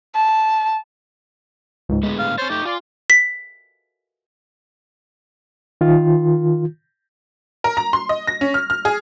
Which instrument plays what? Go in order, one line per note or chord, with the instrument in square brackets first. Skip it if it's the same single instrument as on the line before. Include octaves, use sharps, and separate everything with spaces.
[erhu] A5
[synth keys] C#2 G#2
[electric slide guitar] A2 D3 B3 [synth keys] G#3
[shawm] F5
[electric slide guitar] C4 C#5 [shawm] C5 [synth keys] C#6 A6
[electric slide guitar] A3 D#4 [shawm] G4
[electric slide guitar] F4 [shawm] D5 [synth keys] G#5 C6
[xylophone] B6
[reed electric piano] D#3 F4
[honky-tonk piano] A#4
A#5
C6
D#5
A#6
C#4
F6
F6
G#4